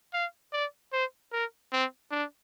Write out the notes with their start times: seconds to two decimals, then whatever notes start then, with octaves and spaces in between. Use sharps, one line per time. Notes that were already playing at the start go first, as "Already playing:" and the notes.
0.13 F5
0.53 D5
0.92 C5
1.32 A#4
1.73 C4
2.11 D4